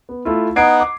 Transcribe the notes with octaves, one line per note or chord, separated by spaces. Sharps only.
B3
A3 E4 F4
B3 D#4 F#5 G#6 C7 D7
D6